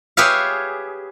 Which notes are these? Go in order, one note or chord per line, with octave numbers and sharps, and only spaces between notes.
G4 G#4 B4 C#5 E5 F5